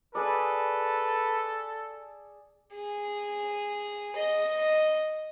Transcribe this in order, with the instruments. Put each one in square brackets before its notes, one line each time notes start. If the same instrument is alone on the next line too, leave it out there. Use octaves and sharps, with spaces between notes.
[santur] G#4 D5 [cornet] A4 [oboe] B4
[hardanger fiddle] G#4
D#5